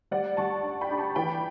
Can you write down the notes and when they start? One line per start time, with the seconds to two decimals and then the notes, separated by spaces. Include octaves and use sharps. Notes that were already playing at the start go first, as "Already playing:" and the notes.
0.11 G3 D5 F#5
0.37 G3 A5 C#6
0.63 D4
0.81 G5 B5
0.90 D4
0.98 A5 C#6
1.15 E3 G5 B5